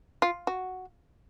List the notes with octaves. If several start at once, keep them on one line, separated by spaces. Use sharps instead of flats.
F4
F#4